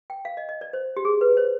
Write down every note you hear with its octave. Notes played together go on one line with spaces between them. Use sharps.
G5
F5
D#5
D#5
D5
C5
G4
G#4
B4
C5